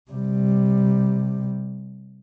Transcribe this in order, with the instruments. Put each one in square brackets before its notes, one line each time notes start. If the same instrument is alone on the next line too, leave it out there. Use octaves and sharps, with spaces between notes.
[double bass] C3 G3